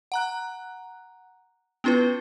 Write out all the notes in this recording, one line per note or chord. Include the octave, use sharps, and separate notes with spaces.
F#5 A#5 F#6
B3 C#4 E4 F4 B4